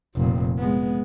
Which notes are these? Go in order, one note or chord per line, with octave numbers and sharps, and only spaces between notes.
F1 A#2
G#3 B3